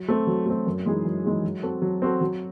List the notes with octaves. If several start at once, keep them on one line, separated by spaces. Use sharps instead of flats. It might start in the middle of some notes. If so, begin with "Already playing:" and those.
Already playing: F#3
A3 C4
F#3
A3 C4
F#2
E3 G#3 D#4 G#4
F#2
E3 G#3 D#4 G#4
F#3
C4 F#4 A4
F#3
C4 F#4 A4
F#3